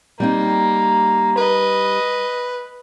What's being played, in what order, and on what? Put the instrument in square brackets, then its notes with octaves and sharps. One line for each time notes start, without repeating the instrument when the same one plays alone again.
[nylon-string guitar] G3 C4 D#4 [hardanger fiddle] A#3
[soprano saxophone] B4 [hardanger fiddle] D#5